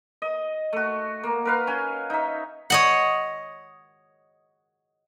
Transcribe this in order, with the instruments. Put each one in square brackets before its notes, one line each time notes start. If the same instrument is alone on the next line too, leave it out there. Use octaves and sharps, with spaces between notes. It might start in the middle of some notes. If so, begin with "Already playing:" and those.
[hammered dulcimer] D#5
A3 F#4
A#3
A#4 B4 F5
C#4 G#5
D#4 E5
[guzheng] C#5 D#5 F#5